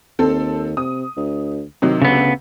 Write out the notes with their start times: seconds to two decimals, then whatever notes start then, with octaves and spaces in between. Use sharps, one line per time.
0.19 D#2 C4 A4
0.77 C3 D#6
1.17 D2
1.82 C3 D#3 F#3
2.02 D2 C#3 B3